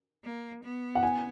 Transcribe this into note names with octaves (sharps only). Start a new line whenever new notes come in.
A#3
B3
F#5
G#5